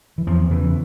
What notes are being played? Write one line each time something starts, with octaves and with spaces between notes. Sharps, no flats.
E3
E2 F3
C#3 E3